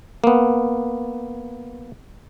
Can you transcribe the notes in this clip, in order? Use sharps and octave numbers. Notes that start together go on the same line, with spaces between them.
A#3 B3